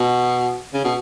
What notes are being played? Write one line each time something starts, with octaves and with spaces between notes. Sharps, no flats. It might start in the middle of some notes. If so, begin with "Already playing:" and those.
Already playing: B2
C#3
B2